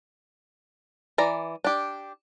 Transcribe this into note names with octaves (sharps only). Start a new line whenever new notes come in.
E3 D5 A#5
D4 G4